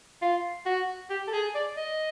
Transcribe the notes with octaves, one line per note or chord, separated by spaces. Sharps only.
F4
F#4
G4
A4
G#4
D5
D#5